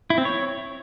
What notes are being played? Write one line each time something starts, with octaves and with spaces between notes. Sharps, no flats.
E4
C4
C#5